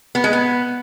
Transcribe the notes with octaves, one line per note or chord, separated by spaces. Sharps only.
B3
G#3
B3